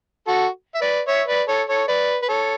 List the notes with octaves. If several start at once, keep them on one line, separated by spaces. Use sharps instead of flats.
F#4 A4
E5
B4 D5
C#5 E5
B4 D5
A4 C#5
A4 C#5
B4 D5
B4
A4 C#5